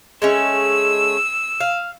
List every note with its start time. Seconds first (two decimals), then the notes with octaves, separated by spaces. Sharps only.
0.22 G#3 A3 C#4 E6
1.60 F5